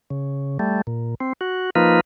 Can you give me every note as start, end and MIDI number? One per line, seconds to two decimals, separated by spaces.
0.10 0.58 49
0.59 0.81 55
0.59 0.81 57
0.87 1.15 46
1.20 1.33 60
1.41 1.70 66
1.75 2.00 53
1.75 2.00 58
1.75 2.00 63
1.75 2.00 65
1.75 2.00 71